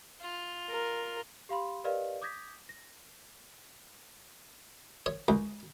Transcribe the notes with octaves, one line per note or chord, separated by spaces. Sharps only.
F4
A#4
G4 F5 B5 C6
G4 A#4 B4 D5 D#5 F5
D6 D#6 G6 G#6 A#6 B6
A#6
C#5
C#2